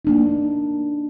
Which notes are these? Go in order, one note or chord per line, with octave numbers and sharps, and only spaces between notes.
A#3 D4 D#4